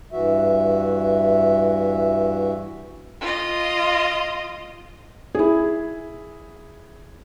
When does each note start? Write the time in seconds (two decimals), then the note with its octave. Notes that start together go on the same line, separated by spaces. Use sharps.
0.12 G2 E3 F#4 E5
3.21 F4 D#5
5.35 E4 G#4